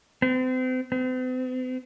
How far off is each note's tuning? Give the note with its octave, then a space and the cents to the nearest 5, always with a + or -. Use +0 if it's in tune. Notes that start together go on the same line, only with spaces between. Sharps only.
C4 -40
C4 -45